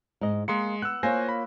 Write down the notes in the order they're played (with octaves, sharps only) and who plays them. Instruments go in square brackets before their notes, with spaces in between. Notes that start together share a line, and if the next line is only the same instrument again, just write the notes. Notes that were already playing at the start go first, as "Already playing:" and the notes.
[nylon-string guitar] G#2 D#5
[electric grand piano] G#3 C6 C#7 [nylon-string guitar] A#3
[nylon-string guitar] B3 [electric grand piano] E6 F#6
[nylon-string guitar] A#3 F4 C#5 [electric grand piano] C5 G#5 A#6
[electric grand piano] B5